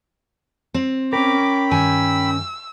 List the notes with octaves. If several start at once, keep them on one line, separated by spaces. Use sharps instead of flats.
C4
C#4 A#4 G5 B5 D6
G2 D#3 G#5 E6